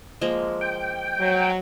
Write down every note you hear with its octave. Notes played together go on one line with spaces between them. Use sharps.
F3 G#3 A#3
G5
F#3